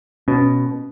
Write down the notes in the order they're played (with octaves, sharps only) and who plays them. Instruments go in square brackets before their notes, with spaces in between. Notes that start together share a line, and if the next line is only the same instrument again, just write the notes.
[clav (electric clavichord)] B2 [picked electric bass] C#4